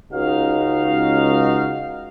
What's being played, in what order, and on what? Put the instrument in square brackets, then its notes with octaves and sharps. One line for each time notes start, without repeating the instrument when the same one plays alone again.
[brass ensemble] C#2 D#4 F#4 F5